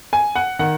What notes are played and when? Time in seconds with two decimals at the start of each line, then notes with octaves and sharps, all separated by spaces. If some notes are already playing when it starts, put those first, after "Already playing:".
0.13 G#5
0.35 F#5
0.59 D#3 F#5